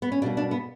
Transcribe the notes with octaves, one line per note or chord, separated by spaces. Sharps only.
B3
C#4
B2 G3 A#3 D4
D4
B3